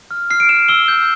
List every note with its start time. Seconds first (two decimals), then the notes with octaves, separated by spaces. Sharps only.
0.11 F6
0.30 F6 C7
0.40 D7
0.49 F6 E7
0.69 E6 G7
0.88 G6